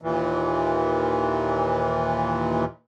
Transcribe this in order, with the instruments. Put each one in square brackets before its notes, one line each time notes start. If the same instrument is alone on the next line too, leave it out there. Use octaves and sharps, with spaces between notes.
[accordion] D#2 A#2 E3